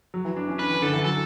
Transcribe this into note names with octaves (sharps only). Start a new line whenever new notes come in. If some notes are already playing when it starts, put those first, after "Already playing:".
F#3
E3
D4
C#4
D4 B4
E3
D3 A4
E3
F#3 A4